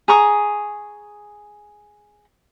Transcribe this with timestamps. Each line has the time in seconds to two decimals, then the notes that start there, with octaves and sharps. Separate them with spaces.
0.08 G#4 A#5 C#6 D#6